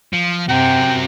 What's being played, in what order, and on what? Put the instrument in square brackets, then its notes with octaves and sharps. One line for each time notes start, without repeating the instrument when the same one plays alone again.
[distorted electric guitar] F3
[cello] C3 [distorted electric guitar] F#4 A#4 [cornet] G5